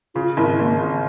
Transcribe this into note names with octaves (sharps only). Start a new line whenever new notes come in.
C#3 F4
G#1 E4
G#1 A#3
C#3